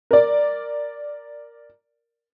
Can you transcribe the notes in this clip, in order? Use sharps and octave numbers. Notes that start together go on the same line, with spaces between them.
A#4 D5